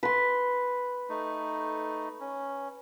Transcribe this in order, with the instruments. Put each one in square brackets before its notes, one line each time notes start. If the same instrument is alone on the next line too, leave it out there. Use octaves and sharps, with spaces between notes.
[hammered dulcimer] B4 C6
[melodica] A3 D#4
C#4